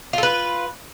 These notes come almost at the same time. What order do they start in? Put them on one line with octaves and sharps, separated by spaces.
F4 A4 B4